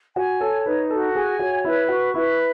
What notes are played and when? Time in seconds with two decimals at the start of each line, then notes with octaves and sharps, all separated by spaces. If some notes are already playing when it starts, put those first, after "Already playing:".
0.15 F#4 G#5
0.40 A4 C#5
0.65 D#4 B4
0.90 F#4 A4
1.15 G#4 G#5
1.39 F#4 C#5
1.64 E4 B4
1.89 F#4 C#6
2.14 E4 B4